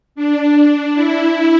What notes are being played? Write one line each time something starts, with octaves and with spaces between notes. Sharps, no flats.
D4
E4